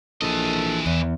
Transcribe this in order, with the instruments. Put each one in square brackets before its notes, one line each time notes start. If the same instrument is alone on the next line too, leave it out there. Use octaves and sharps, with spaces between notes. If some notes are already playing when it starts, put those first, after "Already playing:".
[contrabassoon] A#1 [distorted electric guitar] E3 D#5 [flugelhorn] A4
[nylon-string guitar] E2